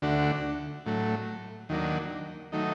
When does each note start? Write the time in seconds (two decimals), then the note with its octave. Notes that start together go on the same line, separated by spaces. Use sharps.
0.02 D2 D3 A3 D4 F#4
0.86 A2 F#3 A3
1.69 D#2 D#3 F#3 A#3 D4
2.52 D#3 F#3 A3 D#4